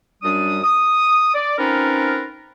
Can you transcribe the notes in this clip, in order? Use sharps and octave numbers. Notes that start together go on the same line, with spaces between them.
F#2 G3 D4 D#6
D#6
D5
C4 C#4 D#4 F4 A#4 B4